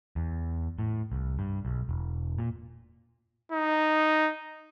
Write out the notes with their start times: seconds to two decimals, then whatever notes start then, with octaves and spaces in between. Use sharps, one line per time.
0.16 E2
0.79 A2
1.12 C2
1.39 G2
1.65 B1
1.89 E1
2.38 A#2
3.52 D#4